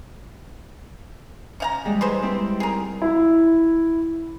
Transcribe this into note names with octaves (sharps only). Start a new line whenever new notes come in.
C#4 F5 A#5
E3 G3 G#3
D#4 G#4 B4 C5
C4 D4 E4
G#4 A#4
E4